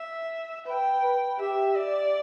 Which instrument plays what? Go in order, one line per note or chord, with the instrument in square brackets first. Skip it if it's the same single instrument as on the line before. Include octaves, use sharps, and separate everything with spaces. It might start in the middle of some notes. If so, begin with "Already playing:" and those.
Already playing: [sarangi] E5
[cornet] B4 [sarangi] G5
[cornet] B4
[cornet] G4 [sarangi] E5
[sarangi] D5